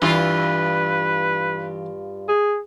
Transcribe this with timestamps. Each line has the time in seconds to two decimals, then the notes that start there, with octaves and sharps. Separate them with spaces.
0.02 G2 E3 F4 B4
2.28 G#4